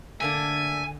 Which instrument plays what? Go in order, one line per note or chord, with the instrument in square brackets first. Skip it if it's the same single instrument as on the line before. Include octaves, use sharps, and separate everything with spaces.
[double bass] D3 [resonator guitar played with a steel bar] A3 A#3 D4 [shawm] E5 [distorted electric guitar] G#5